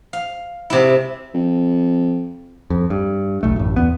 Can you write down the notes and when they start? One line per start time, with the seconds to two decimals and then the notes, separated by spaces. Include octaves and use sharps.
0.13 F5
0.70 C3 G#3 E4
1.34 F2
2.70 F2
2.90 G2
3.43 E1 B1 A3
3.56 A1 F#2
3.76 E2 B3